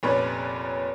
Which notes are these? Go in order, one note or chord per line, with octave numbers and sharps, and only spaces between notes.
F1 A#2 C#4 B4